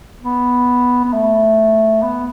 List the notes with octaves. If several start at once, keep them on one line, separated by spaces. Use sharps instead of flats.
B3
B3
A3
B3